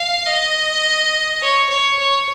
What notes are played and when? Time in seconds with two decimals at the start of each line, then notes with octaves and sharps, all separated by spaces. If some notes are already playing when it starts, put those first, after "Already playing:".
Already playing: F5
0.26 D#5
1.41 C#5
1.69 C#5
1.99 C#5